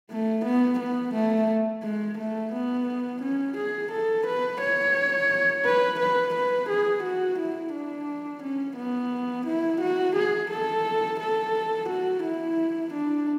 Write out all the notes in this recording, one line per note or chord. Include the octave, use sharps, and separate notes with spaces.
A3
B3
B3
A3
G#3
A3
B3
C#4
G#4
A4
B4
C#5
B4
B4
B4
G#4
F#4
E4
D4
C#4
B3
E4
F#4
G#4
A4
A4
F#4
E4
D4